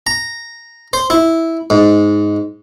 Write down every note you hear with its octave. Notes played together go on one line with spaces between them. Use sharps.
A#5
C5
E4
G#2